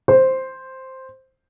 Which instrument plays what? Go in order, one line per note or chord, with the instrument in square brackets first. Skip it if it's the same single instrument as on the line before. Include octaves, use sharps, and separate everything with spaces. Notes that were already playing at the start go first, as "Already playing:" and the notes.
[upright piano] C5